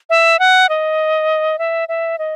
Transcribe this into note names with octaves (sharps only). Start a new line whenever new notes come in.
E5
F#5
D#5
E5
E5
D#5